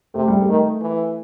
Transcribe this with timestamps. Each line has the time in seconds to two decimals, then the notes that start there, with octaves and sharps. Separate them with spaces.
0.14 C3 A3
0.28 G3
0.42 A3
0.48 D#3
0.81 E3